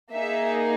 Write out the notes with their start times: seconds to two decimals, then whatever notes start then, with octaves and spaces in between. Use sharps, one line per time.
0.13 A#3 D#4 G#4 E5